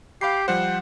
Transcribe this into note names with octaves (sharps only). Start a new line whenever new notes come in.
G4 F5 B5 C7
F3 G3 C5 F#5